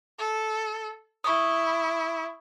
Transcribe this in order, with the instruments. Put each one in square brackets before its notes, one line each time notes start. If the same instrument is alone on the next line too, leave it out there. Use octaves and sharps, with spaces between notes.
[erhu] A4
[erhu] E4 [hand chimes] C#6 D#6